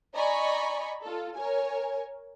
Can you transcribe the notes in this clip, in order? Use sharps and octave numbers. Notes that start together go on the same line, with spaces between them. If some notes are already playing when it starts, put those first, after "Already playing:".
D5 D#5 G#5 A#5 B5 C#6
F4 A4
A#4 C#5 G#5